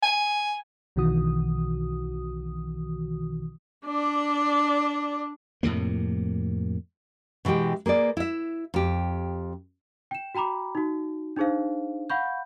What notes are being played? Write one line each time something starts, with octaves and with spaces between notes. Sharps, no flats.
G#5
B1 B2 D#3 E3 F#4 D#6
D4 D5
F2 A2 C3 A#3
B2 E3 G#3 G4 G5
A#3 G#4 B4 D5
E4 E5
F2 G4
G5 E7
F#4 G5 A#5 B5 D6
D#4 F#4
D4 D#4 G#4 C5 F5
F5 F#5 B5 C#6 G6